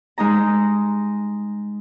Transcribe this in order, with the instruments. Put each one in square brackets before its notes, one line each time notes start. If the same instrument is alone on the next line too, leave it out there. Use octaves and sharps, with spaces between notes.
[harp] G#3 D#4 A#5